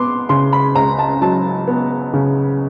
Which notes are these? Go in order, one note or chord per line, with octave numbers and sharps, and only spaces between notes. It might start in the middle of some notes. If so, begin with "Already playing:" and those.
Already playing: B3 C6 D6
C#3 C6
B5
C#2 A#5
A5
F#3 A5
B3
C#3